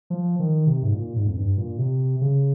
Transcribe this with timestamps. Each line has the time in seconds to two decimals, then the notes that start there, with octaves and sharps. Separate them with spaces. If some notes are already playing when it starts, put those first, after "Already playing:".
0.10 F3
0.39 D#3
0.67 C3
0.83 G#2
0.94 A#2
1.16 G#2
1.27 F2
1.37 G2
1.58 A#2
1.78 C3
2.21 C#3